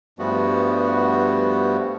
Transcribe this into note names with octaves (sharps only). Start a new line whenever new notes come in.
G2 F3 G3 A3 B3 F#4